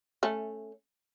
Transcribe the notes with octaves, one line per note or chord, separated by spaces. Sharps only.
A3 C#4